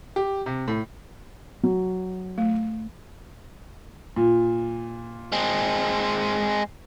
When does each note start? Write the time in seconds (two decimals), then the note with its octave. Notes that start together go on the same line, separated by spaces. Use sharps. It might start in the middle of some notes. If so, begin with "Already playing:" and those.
0.16 G4
0.46 C3
0.68 A2
1.63 F#3
2.38 A3
4.16 A#2
5.32 G#3 C4